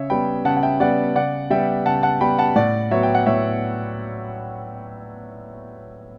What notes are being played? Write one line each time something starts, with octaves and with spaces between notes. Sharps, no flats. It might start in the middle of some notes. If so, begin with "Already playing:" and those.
Already playing: C#3 C#5 E5
G3 B3 G5 B5
C#3 F#5 A5
F#5
E5 G5
G3 B3 D5 F#5
C#3 D5 F#5
G3 B3 E5 G5
C#3 F#5 A5
F#5 A5
G3 B3 G5 B5
F#5 A5
A2 D5 F#5
F#3 B3 C#5 E5
G5
F#5
A2 C#5 E5